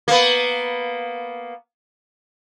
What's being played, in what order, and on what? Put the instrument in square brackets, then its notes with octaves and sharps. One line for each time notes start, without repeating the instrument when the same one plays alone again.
[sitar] A#3 B3